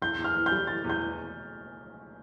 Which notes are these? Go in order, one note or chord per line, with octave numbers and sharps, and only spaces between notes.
E2 G6
E2
F6
E3
G6
G3
E3 A6
E2
G6
E3